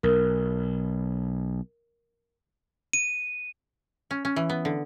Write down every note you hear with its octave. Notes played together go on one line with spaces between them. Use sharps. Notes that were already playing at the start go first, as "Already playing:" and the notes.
B1 A#4
D#7
C#4
C#4
E3
B3
D3